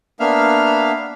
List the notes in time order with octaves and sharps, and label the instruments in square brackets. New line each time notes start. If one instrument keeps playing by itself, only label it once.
[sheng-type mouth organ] A#3 B3 D4 E5 F5 F6